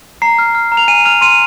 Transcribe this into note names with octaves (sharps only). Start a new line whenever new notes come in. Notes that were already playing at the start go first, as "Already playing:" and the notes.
A#5 C7
F6
F6
A#5
F7
G#5 D#7
F6 F7
C6 D#7